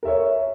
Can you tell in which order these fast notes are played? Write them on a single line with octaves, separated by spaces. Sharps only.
A#4 E5 C#5